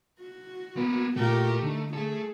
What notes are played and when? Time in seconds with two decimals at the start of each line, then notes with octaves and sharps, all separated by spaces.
0.20 F#4
0.77 A#3 B3 B4
1.16 A#2 A3 F4 G4 A#4
1.62 D3 D#4
1.93 A3 G#4 A4